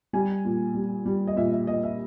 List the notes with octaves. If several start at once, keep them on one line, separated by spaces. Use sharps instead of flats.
G3 G#5
A#2
G3
G3
D#5
A#2 E5
E5
A#2 D#5
E5